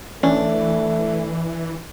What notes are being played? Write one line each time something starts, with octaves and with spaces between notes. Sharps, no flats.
E3 A3 C#4 D4